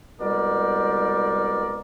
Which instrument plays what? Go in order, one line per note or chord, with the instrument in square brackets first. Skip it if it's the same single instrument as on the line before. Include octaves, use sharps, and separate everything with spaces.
[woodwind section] C2 B2 G3 G#3 A#4 D5